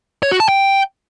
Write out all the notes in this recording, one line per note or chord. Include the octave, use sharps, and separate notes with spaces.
C#5
F#4
A5
G5